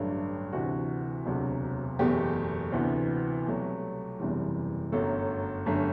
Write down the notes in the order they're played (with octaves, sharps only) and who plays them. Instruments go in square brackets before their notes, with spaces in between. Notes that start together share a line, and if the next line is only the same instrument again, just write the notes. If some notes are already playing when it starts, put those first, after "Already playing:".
Already playing: [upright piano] A1 G2 D3 F#3 A3
D2 C3 E3 F#4
E1 D2 C3 F#3
F#1 E2 B2 A3 G4
D2 C3 E3 B3
C2 B2 F#3 A3
F#1 E2 C3 E3 G3
G1 F#2 F#3 A3 A4
G1 F#2 D3 A3